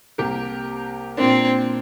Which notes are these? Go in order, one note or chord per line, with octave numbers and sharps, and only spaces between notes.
C2 C3 A#3 G4 A#4
A#2 A#3 C4 D4